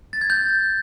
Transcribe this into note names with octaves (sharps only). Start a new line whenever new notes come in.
A6
G#6
G6